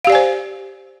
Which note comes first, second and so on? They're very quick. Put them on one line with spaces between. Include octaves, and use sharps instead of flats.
F5 G4 D5 G#5 C5